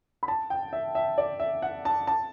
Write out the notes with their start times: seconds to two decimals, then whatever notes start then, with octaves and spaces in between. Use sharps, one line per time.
0.23 B5
0.28 A5
0.50 G5
0.73 E5
0.95 E5
1.18 D5
1.40 E5
1.62 F#5
1.85 A5
2.07 A5